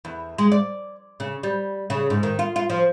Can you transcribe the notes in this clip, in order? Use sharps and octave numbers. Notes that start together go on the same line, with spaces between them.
E2
G#3
D5
C#3
G3
C#3
G#2
D#3
F4
F4
F3